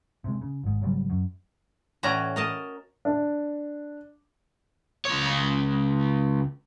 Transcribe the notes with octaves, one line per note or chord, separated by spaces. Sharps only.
C3 G#3
C#3
G#1 G#2
G#1 C#3 F#3 G3
F#2
A2 E3 C#4 F#4 D5 A#5
A#4 D#5 A5
D4
C#2 C#5